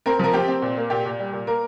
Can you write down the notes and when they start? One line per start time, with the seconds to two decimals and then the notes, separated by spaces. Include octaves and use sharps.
0.06 C4 A#4
0.19 F3 A#4
0.33 C4 G4
0.48 C4
0.62 A#2
0.77 A#3
0.90 A#2 G4
1.05 A#2
1.19 G3
1.33 A#2
1.47 A#3 A#4